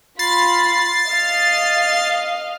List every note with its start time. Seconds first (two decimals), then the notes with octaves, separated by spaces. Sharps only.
0.19 F4 B5 A6 C7
1.09 D#5 F5